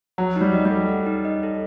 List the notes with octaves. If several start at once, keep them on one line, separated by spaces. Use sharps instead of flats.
F#3 F#5
G3 D#4
D#5
G3
A4
F#5
D#4
D#5
A4